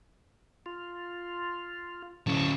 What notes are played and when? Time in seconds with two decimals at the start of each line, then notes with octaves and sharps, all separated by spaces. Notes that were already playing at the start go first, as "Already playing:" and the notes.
0.66 F4
2.27 D2 A2 F#3 C#4 A5 C#6